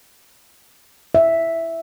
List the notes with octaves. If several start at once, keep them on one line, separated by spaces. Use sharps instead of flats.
E5